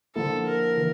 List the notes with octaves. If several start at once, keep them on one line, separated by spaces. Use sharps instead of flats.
D3 F3 A#3 E4 A4
A#4
E3